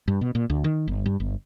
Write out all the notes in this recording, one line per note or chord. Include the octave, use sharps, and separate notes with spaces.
G2
B2
A#2
D2
D#3
G1
G2
G1